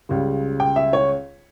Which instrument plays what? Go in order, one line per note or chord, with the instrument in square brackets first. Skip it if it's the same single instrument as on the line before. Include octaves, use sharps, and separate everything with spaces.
[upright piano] C#2 C#3 G3
G5
E5
C#5